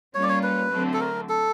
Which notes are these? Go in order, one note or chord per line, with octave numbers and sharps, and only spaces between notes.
G3 A#3 C#4 F4 C#5
D5
C#5
B4
D3 F#3 A3 C4
A4
A#4
A4